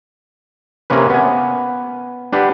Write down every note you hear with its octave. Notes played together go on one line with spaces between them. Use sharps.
C3 A#3 C#4 B4
B3 G#5
D4 G4 B4 F#5